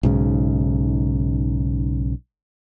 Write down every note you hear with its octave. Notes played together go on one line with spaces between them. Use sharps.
B1 G#2 C#3